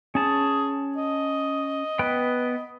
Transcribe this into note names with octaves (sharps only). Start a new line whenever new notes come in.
C#4 G#4 A5
D#5
B3 B4 G5